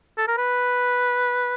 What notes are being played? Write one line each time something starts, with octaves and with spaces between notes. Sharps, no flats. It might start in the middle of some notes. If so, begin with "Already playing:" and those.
A4
A#4
B4